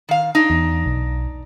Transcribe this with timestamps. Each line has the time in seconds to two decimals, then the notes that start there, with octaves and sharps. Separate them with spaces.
0.09 D#3 F5
0.35 D4 D#4
0.50 E2
0.86 B1